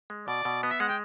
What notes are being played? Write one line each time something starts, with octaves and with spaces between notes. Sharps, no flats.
G#3
B2 D5
B2
B3 D#5
E5
G#3 F#5
G5